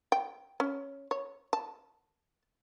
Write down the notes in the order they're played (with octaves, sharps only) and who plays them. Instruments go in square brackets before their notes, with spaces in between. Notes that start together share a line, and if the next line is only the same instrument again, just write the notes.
[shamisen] G5
C#4
C#5
A5